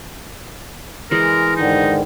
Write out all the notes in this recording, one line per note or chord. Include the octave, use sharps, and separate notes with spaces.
E3 G#3 A#4
G#2 D3 D#3 D#4